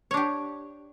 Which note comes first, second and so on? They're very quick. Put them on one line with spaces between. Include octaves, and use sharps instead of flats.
C#5 D4 G4